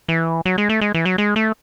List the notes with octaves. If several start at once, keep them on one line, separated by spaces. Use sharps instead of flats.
E3
F#3
G#3
A3
G#3
E3
F#3
G#3
A3